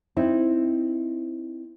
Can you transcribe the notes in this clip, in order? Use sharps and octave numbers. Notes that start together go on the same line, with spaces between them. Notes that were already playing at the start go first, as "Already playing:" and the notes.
C4 D#4 E4